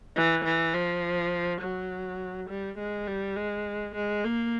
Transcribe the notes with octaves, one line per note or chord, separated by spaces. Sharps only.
E3
E3
F3
F#3
G3
G#3
G3
G#3
G#3
A#3